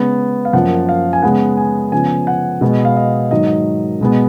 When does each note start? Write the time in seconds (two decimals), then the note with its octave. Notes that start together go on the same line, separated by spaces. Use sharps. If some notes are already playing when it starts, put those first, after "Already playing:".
Already playing: C#3 G#3 B3
0.45 F5
0.53 F#2 F3 A#3 F#5
0.89 F5
1.13 G#5
1.22 C#3 G#3 B3 F#5
1.57 G#5
1.92 C#3 F3 B3 G#5
2.27 F#5
2.61 B2 G#3 B3 D#5
2.85 F5
2.97 D#5
3.31 G#2 D#3 F#3 D#5
4.01 B2 G#3 B3